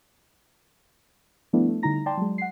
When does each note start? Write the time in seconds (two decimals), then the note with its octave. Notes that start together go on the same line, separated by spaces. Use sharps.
1.53 F3 G3 A3 B3 D4 E4
1.68 A3
1.83 D3 G3 D#4 E4 A#5 A#6
2.06 D5 G5 A5 C6
2.17 F#3 G#3
2.38 F#5 C7